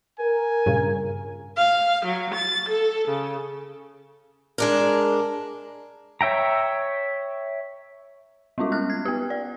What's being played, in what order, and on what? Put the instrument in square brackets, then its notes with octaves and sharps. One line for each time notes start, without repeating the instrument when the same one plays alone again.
[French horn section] A#4 [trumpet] G#5
[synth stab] G2 A#2 C#3
[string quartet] F5
F#3
A6
A4
C#3
[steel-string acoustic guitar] G#3 D4 A#4
[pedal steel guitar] C#5 E5 G5 A#5
[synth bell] G3 G#3 C#4 F4 F#4
C#4 F6 F#6
G#6
B3 G4
D5